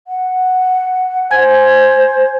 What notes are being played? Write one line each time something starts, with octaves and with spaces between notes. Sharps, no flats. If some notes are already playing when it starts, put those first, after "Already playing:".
F#5
C5 G#5 G#6